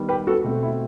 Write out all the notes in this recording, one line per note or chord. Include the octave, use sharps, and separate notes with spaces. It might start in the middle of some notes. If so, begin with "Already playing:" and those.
Already playing: D#3 G3 B3
G4 B4
F#4 A4
B2 A3 C4
E4